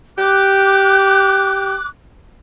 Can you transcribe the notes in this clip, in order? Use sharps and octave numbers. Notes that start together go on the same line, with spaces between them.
G4 D6 F#6